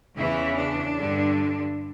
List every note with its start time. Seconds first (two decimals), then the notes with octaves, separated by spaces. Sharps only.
0.17 E2 C#3 E3 E4
0.56 D4
0.96 G2 D3